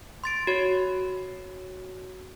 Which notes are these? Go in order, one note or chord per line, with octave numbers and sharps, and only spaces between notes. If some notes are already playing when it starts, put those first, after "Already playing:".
C6 A6 D7
F#4 C#5